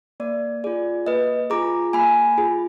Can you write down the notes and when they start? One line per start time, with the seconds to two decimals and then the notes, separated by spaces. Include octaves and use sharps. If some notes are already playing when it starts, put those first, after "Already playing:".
0.20 A#3 D5
0.64 F4 G#4 D5
1.07 A#3 B4 D#5
1.50 F4 G#4 A#5 D6
1.93 A#3 G#5 B5
2.38 F4 G#4